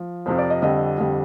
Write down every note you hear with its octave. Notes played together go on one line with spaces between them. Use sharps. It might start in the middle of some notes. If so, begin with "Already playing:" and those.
Already playing: F3
F2 C3 F3 C5
D5
D#5
F2 D3 G3 D#5
F2 D3 G3